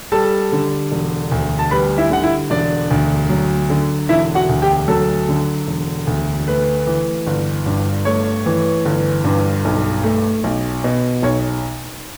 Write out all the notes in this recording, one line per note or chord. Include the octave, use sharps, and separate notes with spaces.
G3 A4 A5
D3
E1
D2
A5
G3 B4 B5
E4 E5
D3 F#5
E4 E5
E1 D4 D5
D2
F#3
D3
E1 E4 E5
F#4 F#5
D2
G4 G5
F#3 A4 A5
D3
E1
D2
A3 B4
E3
G1
G2
A3 C#5
E3
G1
G2
B1
A3
B1
B2
B1 C#5